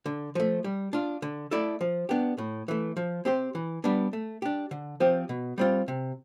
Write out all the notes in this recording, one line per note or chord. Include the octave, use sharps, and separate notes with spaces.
D3
F3 A3
G3
D4 F4
D3
A3 E4 A4 D5
F3
B3 D4 G4
A2
E3 A3
F3
C4 G4 C5
E3
G3 B3 D4
A3
D4 G4
D3
F3 C4 G4
B2
G3 C4 F4
C3